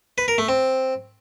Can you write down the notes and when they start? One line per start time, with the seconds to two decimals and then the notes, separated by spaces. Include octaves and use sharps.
0.18 B4
0.28 A#4
0.38 A3
0.48 C4